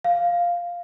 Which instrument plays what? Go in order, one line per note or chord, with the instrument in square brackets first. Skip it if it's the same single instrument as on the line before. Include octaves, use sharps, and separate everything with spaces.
[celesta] F5